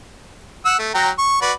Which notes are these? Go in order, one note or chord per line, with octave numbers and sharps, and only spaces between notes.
F#5 E6
A3
F#3 G5 A#5
C#6
F#4 B4 D5